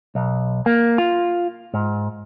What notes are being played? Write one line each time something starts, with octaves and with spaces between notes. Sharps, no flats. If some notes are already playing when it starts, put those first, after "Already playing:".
B1
A#3
F4
G#2